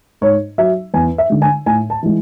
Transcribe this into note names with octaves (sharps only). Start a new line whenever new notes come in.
G#2 C#5
F#3 E5
E2 G#5
E5
D3 G#3
G#5
A2 G#5
A5
E3 G#3